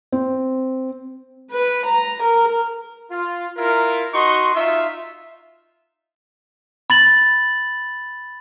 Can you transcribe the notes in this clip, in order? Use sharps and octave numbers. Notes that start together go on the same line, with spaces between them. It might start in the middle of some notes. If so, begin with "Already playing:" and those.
C4
B4
A#5
A#4
F4
E4 F4 A#4
D#4 F#4 D#5 C6 C#6
D#4 F4 E5
B5 A6 F#7